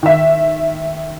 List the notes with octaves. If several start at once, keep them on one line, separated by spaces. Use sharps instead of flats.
D#3 E5